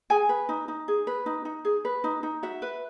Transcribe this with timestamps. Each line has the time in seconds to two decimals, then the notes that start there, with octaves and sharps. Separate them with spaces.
0.10 G#4 G#5
0.29 B4
0.49 D#4
0.68 D#4
0.88 G#4
1.07 B4
1.26 D#4
1.45 D#4
1.65 G#4
1.85 B4
2.04 D#4
2.23 D#4
2.43 F#4 E5
2.62 B4